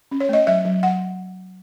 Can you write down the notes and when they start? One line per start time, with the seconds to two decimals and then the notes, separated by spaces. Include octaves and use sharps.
0.11 C#4
0.20 C#5
0.29 A3 D#5
0.47 F#3 E5
0.65 F#3
0.83 F#3 F#5